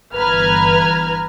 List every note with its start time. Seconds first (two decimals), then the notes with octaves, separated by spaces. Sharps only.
0.14 G1 E3 B4 A#5 F6 G#6